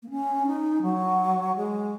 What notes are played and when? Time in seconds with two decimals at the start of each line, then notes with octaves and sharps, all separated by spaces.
0.03 A#3
0.10 C#4
0.46 D#4
0.82 F#3
1.56 G#3